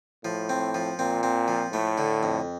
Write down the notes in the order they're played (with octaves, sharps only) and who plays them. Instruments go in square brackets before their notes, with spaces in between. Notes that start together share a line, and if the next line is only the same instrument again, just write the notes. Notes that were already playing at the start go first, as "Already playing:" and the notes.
[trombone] A2 [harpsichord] F3
[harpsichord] C4
F3
[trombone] A#2 [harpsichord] C4
[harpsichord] C4
F3
[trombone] A2 [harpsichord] A3
[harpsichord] D3
F2